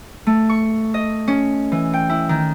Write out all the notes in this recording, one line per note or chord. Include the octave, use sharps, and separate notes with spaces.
A3
C#6
D#5
C#4
E3
G5
E4
D#3